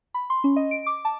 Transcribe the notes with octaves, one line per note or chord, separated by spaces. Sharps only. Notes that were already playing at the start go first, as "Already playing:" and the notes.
B5
C6
C#4
D#5
D7
D6
A5